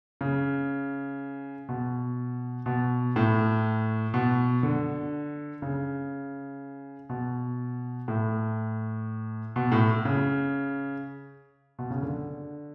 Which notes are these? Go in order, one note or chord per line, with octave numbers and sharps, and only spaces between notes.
C#3
B2
B2
A2
B2
D3
C#3
B2
A2
B2
A2
C#3
B2
C#3
D3